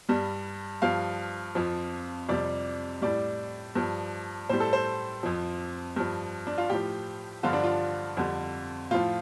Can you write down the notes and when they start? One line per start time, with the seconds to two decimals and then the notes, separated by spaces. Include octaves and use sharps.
0.09 G2 G3
0.82 G2 F3 F5
1.55 F2 F3
2.29 F2 C3 G3 D5
3.02 A2 G3 D5
3.75 G2 F3
4.49 A2 G3 C5
4.60 A4
4.73 C5
5.23 F2 F3
5.96 G2 F3
6.47 D4
6.58 F4
6.70 A2 F3 G4
7.43 G2 D3 F3 F4
7.53 D4
7.64 F4
8.17 F2 D3 G3
8.91 A2 F3 F4